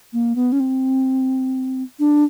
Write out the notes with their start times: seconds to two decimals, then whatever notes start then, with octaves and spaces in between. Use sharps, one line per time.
0.13 A#3
0.36 B3
0.52 C#4
0.60 C4
1.99 D4